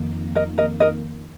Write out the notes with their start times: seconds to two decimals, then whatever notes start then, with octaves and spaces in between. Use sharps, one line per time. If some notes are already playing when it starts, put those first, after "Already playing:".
Already playing: F2 D#3 A#3
0.35 A#4 D#5
0.58 A#4 D#5
0.80 A#4 D#5